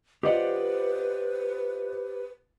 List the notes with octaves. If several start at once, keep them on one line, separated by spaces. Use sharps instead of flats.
F4 G4 B4 C5 D5 D#5 F#5